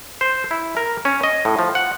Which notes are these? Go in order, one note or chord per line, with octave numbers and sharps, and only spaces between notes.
C5
E4
A#4
C#4
D#5
A2
F3
F#5